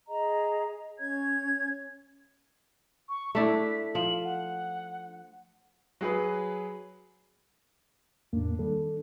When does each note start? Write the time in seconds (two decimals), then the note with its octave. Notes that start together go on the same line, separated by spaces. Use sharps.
0.08 G#4 D#5 A#5
1.00 C#4 C#5 G#6
3.09 C#6
3.35 A3 D4 E4 B6
3.95 F3 F#7
4.24 F#5
6.01 F#3 G#4 B4
8.33 E2 A2 A#3 D4
8.59 D#3 G3 A4